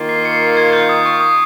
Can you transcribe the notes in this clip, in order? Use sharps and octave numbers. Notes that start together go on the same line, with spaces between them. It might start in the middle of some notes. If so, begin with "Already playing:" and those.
Already playing: D#3 A#3 F4
C7
C#7
C7
G#6
G6
D#6
C#6
D#6